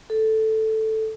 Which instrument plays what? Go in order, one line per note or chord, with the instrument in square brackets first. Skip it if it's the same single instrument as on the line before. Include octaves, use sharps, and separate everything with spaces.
[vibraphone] A4